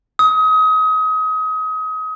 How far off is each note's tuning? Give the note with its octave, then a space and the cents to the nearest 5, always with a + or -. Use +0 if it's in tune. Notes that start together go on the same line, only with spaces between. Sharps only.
D#6 +30